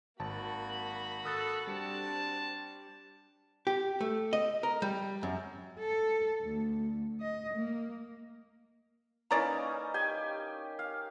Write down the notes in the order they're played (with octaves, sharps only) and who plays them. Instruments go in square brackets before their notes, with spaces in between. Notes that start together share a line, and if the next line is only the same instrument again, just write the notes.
[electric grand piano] G#1 A5 [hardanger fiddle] A#3 B5 [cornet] F#4
[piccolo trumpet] A4 [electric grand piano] D#6 F#6 A6
[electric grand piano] G3 C#7 [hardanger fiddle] C4 D4 [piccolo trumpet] A5
[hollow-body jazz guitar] G4
A3
D#5
A#4
G3
F#2
[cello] A4
D2
D#5
A#3
[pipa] E3 D5 A#5 [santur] A#3 C#4 D#4
[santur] G4 G5 G#5
F5